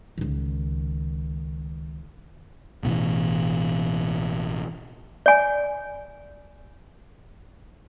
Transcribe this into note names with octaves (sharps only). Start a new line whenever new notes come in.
C#2 D#3
A1 B2 D#3 E3
D5 G#5